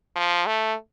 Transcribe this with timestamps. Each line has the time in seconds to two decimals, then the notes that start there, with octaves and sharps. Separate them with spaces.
0.16 F3
0.47 A3